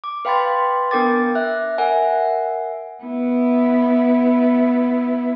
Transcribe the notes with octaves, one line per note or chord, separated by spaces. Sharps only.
D6
B4 F5 G5 B5 C6 A6
B3 D4 A#4 G5 D6 A6
E5 F#6
A#4 E5 F#5 G#5
B3 E4